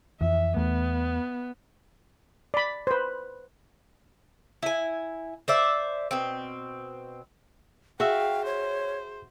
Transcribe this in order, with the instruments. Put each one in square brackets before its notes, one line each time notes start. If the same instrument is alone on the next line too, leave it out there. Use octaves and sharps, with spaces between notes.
[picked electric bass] F2 E3 [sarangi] E5
[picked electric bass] E2 A3 [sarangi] B3
[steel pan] D5 B5
B4 C5
[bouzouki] E4 G#5
C5 D5 E5
B2 C4
[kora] F#4 E5 [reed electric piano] G#4 [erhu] F5 [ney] G5
[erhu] C5 [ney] C#5